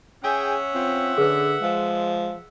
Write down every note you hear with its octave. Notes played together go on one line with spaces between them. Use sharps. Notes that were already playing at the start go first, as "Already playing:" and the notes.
C#4 G#4 E5 F#5 G5
C4 F4
D3 G#4 B4
F3 G#3